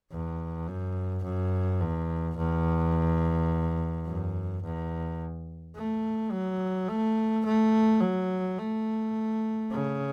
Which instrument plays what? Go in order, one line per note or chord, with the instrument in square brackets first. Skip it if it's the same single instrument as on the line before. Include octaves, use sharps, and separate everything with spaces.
[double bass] E2
F#2
F#2
E2
E2
F#2
E2
A3
F#3
A3
A3
F#3
A3
C#3